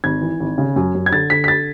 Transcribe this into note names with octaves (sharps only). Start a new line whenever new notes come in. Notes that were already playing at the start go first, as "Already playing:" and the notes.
G#1 G#6
E3
G#1
C#3
F#2
F#2
G#6
D3 A6
D3 B6
B6
A6